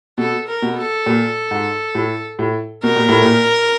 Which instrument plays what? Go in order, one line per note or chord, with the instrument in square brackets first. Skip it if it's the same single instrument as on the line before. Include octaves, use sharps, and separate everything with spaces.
[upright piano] B2 [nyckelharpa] A4
[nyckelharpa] A#4
[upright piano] B2
[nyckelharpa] A4
[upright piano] A#2
G#2
A2
A2
[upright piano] B2 [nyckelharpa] A#4
[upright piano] A#2
A2
A#2